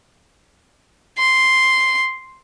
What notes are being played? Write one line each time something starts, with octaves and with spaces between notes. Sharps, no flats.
C6